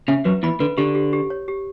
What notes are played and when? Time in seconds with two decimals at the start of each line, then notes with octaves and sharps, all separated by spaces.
0.08 C#3 C#4 E5
0.25 F#2 F#3 B4
0.43 E2 E3 B5
0.60 D3 B4
0.77 D3 G4
0.95 G4
1.13 G4
1.30 C#5
1.48 G4